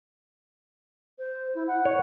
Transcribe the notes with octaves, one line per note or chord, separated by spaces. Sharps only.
C5
E4
F#5
C#5